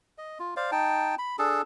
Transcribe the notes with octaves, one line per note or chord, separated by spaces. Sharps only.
D#5
F4
C5 D5 F5
D#4 G5 A5
B5
D4 G#4 A4 A5